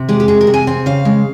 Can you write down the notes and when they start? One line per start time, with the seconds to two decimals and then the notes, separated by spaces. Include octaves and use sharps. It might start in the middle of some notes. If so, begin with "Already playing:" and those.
Already playing: C3
0.09 G#3 G4
0.20 G4
0.28 C3 G#4
0.41 A#4
0.47 C3
0.54 G#5
0.67 C4 G#5
0.86 C#3 F5
1.05 G#3